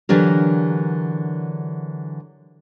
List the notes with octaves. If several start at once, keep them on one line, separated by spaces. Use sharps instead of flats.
D3 E3 F#3 D4 G4 A#4